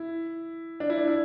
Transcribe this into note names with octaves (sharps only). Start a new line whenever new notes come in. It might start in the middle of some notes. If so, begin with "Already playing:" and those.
Already playing: E4
D4
E4
D4
E4